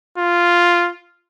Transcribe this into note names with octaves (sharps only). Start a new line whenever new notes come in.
F4